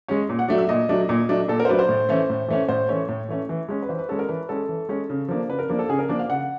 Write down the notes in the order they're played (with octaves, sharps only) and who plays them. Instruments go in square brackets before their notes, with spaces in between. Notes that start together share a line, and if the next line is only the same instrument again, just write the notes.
[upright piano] G#3 C#4
A#2
F#5
F#3 A3 D4
E5
A#2 D#5
F#3 A3 D4
A#2
F#3 A3 D4
A#2 A4
A#4
C5
F#3 A3 D4 B4
C5
A2
E3 A3 C#4
A2
E3 A3 C#4
A2 C5
E3 A3 C#4 C#5
A2
E3 A3 C#4
E3
G#3 C#4
B4
E3 C5
B4
G#3 C#4 A4
A#4
E3 B4
G#3 C#4 A4
E3
G#3 C#4
C#3
F3 A#3 D4
C#3 B4
A#4
F3 A#3 D4
A4
C#3 G#4
A#4
F3 A#3 D4
F5
C#3 F#5